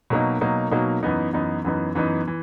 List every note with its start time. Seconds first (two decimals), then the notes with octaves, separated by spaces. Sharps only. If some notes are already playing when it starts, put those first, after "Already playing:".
0.10 B2 F#3 A#3 D#4
0.41 B2 F#3 A#3 D#4
0.71 B2 F#3 A#3 D#4
1.03 F#2 E3 B3 D#4
1.33 F#2 E3 B3 D#4
1.65 F#2 E3 B3 D#4
1.95 F#2 E3 B3 D#4
2.28 E3